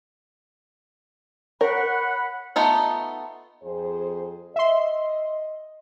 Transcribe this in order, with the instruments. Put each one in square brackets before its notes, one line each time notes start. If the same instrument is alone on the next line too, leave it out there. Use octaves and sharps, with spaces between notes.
[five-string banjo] A#4 [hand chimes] C#5 [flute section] F#5 B5
[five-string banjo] A3 B3 D#4 F4
[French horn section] F2 G#4 C5
[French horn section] D#5 [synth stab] E5 C6